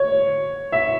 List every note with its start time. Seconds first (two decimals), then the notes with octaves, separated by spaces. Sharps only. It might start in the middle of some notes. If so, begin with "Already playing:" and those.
Already playing: C#5
0.72 E5